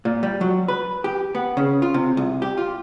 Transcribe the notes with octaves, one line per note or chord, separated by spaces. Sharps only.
A#2
G3
F#3
B4
G4
B3
C#3
F4
C3
C2
G4
F4